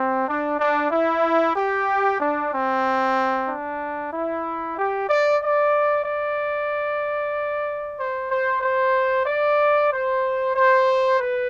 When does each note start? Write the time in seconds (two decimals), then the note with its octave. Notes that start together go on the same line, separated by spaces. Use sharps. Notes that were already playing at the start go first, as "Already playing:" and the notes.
Already playing: C4
0.27 D4
0.58 D4
0.91 E4
1.55 G4
2.20 D4
2.51 C4
3.47 D4
4.12 E4
4.76 G4
5.08 D5
5.41 D5
6.04 D5
7.97 C5
8.30 C5
8.62 C5
9.26 D5
9.90 C5
10.54 C5
11.19 B4